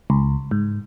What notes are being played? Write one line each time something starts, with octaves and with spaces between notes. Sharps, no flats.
C#2
G#2